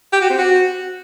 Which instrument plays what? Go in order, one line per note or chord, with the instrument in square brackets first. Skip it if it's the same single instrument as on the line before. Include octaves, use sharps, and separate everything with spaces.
[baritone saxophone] G4
F#4
C4
F#4